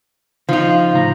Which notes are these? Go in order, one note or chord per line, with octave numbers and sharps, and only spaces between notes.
C#3 F3 D#4 F4
C#2 A2 A#5